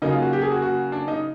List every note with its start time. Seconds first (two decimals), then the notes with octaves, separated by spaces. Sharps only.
0.02 C#3 F#3 A#3 D#4
0.12 F4
0.22 F#4
0.33 G4
0.42 G#4
0.52 F#4
0.62 F#4
0.92 D4
1.08 D#4